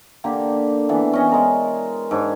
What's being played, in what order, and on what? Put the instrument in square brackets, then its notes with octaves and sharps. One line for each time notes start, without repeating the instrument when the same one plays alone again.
[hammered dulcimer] D3 A#3 G4
E3 B3 D4
C#4 D#5
G#3 A#4 D5
G#2 D4 C#5